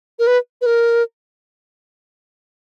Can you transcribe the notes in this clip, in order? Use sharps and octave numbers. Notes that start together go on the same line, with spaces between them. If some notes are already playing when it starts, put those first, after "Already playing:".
A#4
B4
B4
A#4